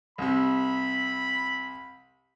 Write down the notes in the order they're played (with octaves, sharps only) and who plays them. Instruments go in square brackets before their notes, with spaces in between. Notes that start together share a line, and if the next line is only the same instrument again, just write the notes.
[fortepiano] C2 C3 [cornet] B5